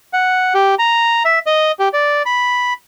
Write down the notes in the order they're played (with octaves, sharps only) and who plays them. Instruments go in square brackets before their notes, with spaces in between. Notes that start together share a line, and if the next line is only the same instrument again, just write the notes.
[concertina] F#5
G4
A#5
E5
D#5
G4
D5
B5